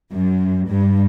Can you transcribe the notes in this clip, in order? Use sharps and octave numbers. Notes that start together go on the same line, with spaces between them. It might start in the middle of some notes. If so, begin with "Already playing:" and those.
F#2
G2